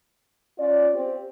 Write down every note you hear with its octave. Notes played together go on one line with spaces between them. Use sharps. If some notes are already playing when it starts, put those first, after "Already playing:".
C#4 F4 D5
C4 G4